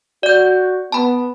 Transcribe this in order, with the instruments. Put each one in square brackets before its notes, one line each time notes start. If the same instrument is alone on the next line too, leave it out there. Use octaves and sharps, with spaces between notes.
[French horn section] F#4 [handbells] D5 G6
[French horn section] B3 [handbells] A5 B5